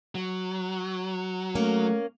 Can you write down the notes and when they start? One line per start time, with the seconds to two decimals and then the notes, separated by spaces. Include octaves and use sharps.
0.15 F#3
1.55 A3 A#3 C#4